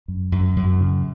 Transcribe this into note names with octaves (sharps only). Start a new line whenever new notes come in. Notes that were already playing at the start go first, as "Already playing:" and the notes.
F#2
F#2
F#2
C#3